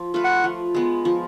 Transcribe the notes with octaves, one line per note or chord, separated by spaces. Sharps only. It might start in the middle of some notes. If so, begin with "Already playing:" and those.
Already playing: F3
A3 F4 B4
F#5
F3
G#3 B3
F3